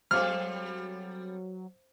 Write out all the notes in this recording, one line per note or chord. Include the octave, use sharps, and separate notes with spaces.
F#3 G3 C4 A4 C5 F5 D6 F6